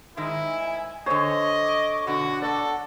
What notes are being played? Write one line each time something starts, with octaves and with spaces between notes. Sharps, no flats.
G#2 D#3 G#3 E4 G#5
D3 C5 C#5 D#5
C#6 D6
B2 D3 D4 F#4 F#5
A4 D5